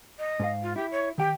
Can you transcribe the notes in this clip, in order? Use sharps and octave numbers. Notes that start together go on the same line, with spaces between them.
D#5
G#2 A4 F5
F4
E4 G4
C#5
D#3 G4 G5